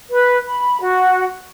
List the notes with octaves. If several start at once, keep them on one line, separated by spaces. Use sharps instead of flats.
B4
B5
F#4